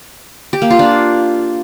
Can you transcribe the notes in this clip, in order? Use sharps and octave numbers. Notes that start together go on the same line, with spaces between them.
G4
A#3
F4
D4